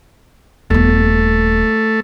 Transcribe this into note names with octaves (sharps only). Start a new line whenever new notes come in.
D#1 A3 B3